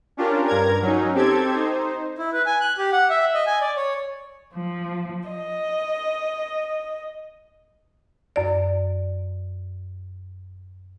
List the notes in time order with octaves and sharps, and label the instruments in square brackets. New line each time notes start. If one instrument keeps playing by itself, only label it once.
[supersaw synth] C#4 D4 F4 G4 A#4
G2 A#4 A#5 G#6
F#3 C#4 D#4
C4 G4 A4 G#6
D#4 C5
[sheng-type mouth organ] E4
B4
G#5
F#6
G4
F#5
E5
D#5
G#5
D5
C#5
[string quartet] F3
D#5
[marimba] F#2 D5